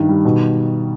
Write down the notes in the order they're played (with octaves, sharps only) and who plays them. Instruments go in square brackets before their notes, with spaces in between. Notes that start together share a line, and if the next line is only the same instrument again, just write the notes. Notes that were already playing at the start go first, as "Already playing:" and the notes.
Already playing: [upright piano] G2 D#3
G3
B2